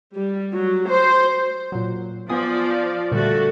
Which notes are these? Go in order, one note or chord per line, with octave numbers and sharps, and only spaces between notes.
G3
F#3
C5
A#2 F#3
F3 B3 D5 G#5 D#6
A#2 D3 G3 A3 F#4 A4